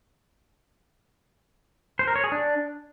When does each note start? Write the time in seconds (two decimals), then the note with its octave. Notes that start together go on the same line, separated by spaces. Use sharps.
1.99 C5
2.07 A#4
2.16 C#5
2.24 G#4
2.32 D4